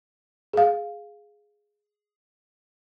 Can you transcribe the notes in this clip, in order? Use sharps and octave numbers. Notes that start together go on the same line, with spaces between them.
G#4 F5